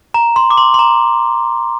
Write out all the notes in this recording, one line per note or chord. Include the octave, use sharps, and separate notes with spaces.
A#5
C6
D6
C6
C6
A#5